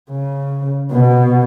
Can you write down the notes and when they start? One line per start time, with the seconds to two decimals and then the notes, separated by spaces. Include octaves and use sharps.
0.10 C#3
0.92 B2